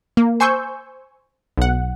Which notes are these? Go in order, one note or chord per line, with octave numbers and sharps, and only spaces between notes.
A#3
C5 G#5 C6 C#6 E6 G6
B1 F#5